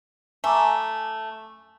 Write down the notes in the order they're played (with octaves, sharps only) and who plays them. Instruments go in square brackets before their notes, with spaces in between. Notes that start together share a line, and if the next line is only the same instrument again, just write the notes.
[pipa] A3 [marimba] G#5 A#5 D6